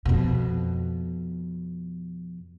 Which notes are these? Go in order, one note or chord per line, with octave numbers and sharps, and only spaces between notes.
F2 B2